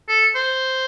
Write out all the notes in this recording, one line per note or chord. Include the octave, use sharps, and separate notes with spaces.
A4
C5